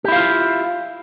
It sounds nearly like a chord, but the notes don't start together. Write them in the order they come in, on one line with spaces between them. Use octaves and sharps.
G4 E4 F5 F4